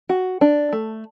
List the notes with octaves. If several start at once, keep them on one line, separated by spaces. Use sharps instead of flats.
F#4
D4
A3